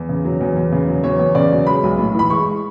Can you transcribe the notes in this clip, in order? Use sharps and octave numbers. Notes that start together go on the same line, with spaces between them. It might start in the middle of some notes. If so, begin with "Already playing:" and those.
Already playing: E2
C#3
F#3
E2
E2
C#3
F#3
E2 C#5
E2
C#3 D5
F#3
G#3 B5
B1
A2
E3 B5
G#3 C#6